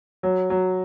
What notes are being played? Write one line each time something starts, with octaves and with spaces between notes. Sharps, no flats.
F#3
F#3